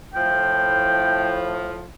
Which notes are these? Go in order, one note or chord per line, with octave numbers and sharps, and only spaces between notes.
A2 F3 G5